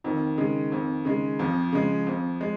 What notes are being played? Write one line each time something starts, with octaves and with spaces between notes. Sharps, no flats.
F2 D#3
C#3 G#3
F2
C#3 G#3
F2 F3
C#3 G#3
F2
G#3